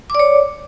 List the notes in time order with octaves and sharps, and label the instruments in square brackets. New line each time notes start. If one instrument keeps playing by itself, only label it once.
[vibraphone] D6
D5
C#5